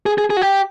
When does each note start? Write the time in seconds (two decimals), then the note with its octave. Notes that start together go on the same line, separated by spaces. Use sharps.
0.06 G#4
0.18 G#4
0.30 G#4
0.37 F#4
0.42 G4